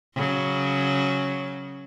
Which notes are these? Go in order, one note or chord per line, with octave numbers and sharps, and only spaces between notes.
C#3 F#3